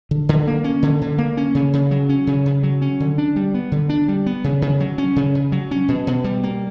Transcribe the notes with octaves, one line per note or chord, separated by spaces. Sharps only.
D3
D3
A#3
C#4
D3
D3
A#3
C#4
C#3
C#3
F#3
C#4
C#3
C#3
F#3
C#4
D3
D4
G3
B3
D3
D4
G3
B3
C#3
C#3
F#3
C#4
C#3
C#3
F#3
C#4
B2
B2
G3
A#3